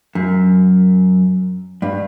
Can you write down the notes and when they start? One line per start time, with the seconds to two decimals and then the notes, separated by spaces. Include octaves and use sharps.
0.15 F#2
1.82 G2